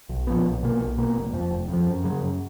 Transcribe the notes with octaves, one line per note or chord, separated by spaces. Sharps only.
B1
A#2 F3 B3
B1
B2 A#3
B1
B2 A#3
F1
F2 F3
F1
F2
F3
F#2
C#3 F#3
F#2